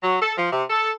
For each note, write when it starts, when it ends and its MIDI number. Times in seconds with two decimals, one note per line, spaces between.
0.02 0.16 54
0.21 0.32 69
0.38 0.52 53
0.52 0.63 48
0.70 0.91 69